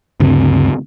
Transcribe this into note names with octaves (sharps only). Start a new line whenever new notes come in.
D2 G2 C#3 C4